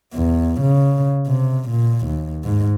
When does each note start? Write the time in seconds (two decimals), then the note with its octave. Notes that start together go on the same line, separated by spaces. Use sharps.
0.14 E2
0.61 C#3
1.27 C3
1.69 A#2
2.06 D#2
2.44 G#2